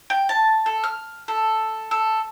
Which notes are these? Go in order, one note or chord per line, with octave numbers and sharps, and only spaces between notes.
G5
A5
A4
F6
A4
A4